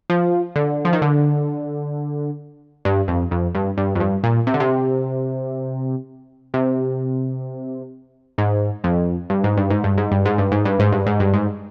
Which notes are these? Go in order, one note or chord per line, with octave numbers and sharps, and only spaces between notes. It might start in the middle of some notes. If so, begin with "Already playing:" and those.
F3
D3
F3
D#3
D3
G2
F2
F2
G2
G2
F2
G2
A#2
C3
D3
C3
C3
G#2
F2
G2
G#2
G2
G#2
G2
G#2
G2
G#2
G2
G#2
G2
G#2
G2
G#2
G2
G#2